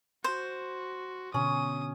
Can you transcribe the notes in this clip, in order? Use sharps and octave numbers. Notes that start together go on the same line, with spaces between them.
F#4 C5
B2 D3 C#4 D#6